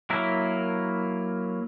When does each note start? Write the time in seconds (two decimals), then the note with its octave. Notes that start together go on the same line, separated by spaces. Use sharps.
0.10 F#3 A#3 E4 A#4 E5